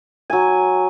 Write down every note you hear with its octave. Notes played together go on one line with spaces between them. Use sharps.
F#3 G#5